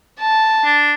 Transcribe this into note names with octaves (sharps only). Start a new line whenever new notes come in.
A5
D4